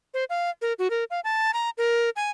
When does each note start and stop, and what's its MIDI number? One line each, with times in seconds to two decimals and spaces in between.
0.14 0.24 72
0.30 0.50 77
0.62 0.73 70
0.79 0.90 66
0.90 1.04 70
1.11 1.20 77
1.24 1.51 81
1.53 1.70 82
1.78 2.10 70
2.16 2.31 80